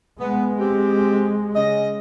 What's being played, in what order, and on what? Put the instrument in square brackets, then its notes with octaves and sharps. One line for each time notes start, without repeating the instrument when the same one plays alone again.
[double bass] G#3 [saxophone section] B3
[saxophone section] C4 G4
C#3 D#5